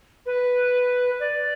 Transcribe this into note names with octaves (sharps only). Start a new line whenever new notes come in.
B4
D5